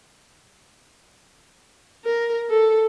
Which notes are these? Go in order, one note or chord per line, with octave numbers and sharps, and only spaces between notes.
A#4
A4